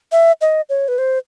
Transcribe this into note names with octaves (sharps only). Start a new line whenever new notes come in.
E5
D#5
C#5
B4
C5